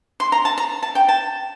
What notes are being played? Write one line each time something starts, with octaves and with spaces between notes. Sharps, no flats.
C6
A#5
A5
A#5
A5
G5
A5